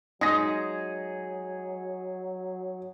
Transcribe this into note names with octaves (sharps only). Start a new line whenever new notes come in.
F#3 G#3 D#4 G#4 D#6 A#6